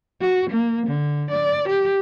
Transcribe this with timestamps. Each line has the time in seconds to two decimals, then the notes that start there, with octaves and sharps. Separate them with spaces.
0.21 F#4
0.50 A#3
0.87 D3
1.31 D5
1.69 G4